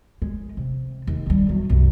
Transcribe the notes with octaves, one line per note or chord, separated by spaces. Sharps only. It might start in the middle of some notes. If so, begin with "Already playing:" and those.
G#3
C3
D#2
D#3 G3
E2 F#3
C2 F#2